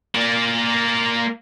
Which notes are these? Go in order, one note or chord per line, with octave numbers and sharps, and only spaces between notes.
A#3 D5